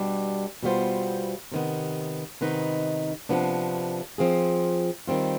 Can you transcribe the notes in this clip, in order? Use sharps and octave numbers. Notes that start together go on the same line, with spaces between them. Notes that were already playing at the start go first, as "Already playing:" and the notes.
Already playing: B2 G3 D4 G4
B2 G3 B3 F4 C5
C3 D#3 B3
C3 D#3 B3 D#4 B4
C3 F3 B3 D4
F3 C4 F4 G#4
D#3 G3 C4 F4